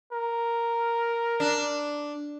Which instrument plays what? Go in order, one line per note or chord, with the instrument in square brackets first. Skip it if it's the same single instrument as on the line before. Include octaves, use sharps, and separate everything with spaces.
[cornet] A#4
[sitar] D4